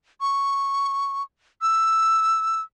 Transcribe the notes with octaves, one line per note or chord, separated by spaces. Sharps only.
C#6
E6